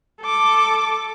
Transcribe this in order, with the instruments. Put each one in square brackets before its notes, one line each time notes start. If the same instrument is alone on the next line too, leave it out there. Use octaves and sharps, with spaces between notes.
[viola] A4 D6